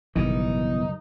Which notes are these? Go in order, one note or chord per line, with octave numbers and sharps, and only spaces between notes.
G#1 C#2 F#2 B2 D#3 E3 G3 D#4